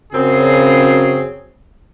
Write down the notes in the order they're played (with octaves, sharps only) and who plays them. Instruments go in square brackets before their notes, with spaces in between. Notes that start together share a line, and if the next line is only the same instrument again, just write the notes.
[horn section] F#2 C#3 F#3 C4 G#4